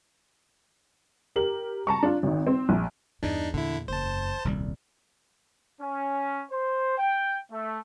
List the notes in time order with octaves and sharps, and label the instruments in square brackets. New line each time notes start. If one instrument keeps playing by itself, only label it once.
[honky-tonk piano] G4 A#4 F#7
A5 A#5 C#6
D4 F4
G#1 D#3
C4
A#1
[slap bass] E2 [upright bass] G2 [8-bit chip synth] D4 D#4
[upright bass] A#2 [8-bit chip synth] D3 E4
[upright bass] F#1 F#2 [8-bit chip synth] C5 A5
[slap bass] D#1 C2 G3 [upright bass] F2
[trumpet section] C#4
C5
G5
A3